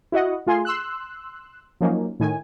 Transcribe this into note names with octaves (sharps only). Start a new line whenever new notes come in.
E4 F#4 D#5 F#5
A3 F4 G#4 C6
C6 E6 F#6
F3 F#3 A#3 C#4 D#4
A2 D#3 G#5